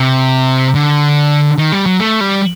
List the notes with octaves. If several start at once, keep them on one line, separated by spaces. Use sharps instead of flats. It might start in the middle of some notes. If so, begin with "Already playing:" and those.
Already playing: C3
D3
D#3
G3
F#3
A3
G3